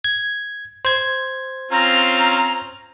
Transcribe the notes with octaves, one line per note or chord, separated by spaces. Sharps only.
G#6
C5 G#6
C4 C#4 F4 A#5